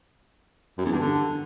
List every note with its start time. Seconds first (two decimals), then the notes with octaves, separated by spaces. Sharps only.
0.78 F#2
0.85 E2
0.92 G2
0.99 D3